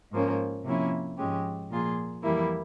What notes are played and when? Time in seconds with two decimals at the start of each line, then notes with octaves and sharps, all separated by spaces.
0.12 G#2 F3 A#3 C#4
0.64 C3 F3 A#3 C#4 E4
1.17 G#2 F3 G#3 C#4 G4
1.70 A#2 F3 A#3 F4 G#4
2.23 F2 E3 G3 A#3 E4